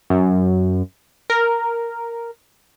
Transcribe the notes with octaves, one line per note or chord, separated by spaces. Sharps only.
F#2
A#4